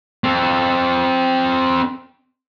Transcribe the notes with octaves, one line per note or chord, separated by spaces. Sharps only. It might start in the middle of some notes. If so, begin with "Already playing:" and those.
C4 A4